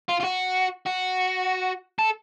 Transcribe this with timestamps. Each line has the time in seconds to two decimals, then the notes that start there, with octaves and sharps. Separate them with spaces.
0.09 F4
0.20 F4
0.24 F#4
0.86 F#4
1.99 A4